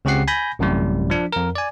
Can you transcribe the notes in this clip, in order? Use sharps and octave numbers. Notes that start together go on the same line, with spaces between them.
C#2 C#3 C4 G4 F#5 C7
G#5 B5 G6 A#6
A1 F#2 A2 C3 G3
F3 D4
F2 A#4
D5 G#5